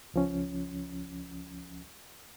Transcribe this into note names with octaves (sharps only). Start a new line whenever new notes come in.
C#2 F3 C#4